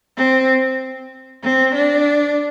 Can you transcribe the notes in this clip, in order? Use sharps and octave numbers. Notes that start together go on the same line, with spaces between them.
C4
C4
D4